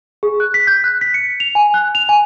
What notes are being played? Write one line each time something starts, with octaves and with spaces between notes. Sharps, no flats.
G#4
F#6
B6
G6
F#6
B6
C#7
F7
G#5
F#6
F7
G#5